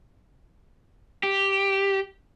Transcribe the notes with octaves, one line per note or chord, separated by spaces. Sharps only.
G4